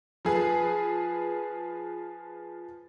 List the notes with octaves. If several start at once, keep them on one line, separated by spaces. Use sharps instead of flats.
F3 G#4 B4